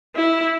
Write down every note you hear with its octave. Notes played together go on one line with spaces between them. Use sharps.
E4